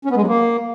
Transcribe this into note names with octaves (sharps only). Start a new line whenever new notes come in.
C#4
B3
G#3
F#3
A#3